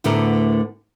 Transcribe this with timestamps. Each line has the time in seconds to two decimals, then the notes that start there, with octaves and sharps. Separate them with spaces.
0.04 D2 A2 D3 A3 B3 A#4